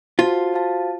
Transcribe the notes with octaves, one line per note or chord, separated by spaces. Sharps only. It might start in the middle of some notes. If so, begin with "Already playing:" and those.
F4 F#4 C5 F5 A5
F#4 C5 F5 A5